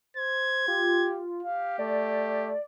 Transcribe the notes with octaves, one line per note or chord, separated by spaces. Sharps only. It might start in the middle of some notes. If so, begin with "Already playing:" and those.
C5 G#6
F4 G4
G4 F5
A3 D5